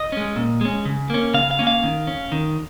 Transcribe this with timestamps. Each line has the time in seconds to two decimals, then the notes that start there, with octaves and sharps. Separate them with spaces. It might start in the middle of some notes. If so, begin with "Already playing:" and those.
Already playing: D#5
0.12 G#3 C#4
0.36 A#2
0.61 G#3 C#4
0.85 C#3
1.10 A#3 C#4
1.34 C#3 F5
1.51 F5
1.59 A#3 C#4
1.67 F5
1.83 D#3
2.07 C#4
2.32 D#3